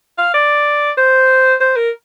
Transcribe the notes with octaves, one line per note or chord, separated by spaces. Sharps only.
F5
D5
C5
C5
A#4